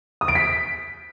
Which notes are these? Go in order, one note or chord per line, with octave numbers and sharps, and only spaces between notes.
D#6
D7
B6